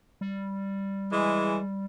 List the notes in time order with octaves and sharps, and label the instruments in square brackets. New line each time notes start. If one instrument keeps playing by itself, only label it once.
[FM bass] G3
[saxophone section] E3 G#3